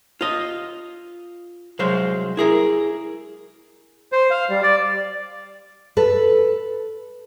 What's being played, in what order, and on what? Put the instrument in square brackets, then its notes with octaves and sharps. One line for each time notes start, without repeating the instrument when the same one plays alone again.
[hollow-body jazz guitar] F4 D#5
C2 F#3 G#3 C5 F5
E4 G#4 A#4
[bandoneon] C5
F5
G3
D5
[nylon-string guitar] A4 B4